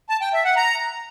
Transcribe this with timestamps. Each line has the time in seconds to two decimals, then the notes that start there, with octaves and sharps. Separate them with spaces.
0.09 A5
0.21 G5
0.33 E5
0.45 F#5
0.57 A#5